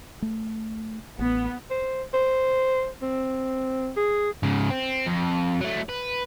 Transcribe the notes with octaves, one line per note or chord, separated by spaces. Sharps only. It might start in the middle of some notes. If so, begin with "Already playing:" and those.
A3
A1 B3
C5
C5
C4
G#4
G#2 C#3
C4
F2
F#3 A3
B4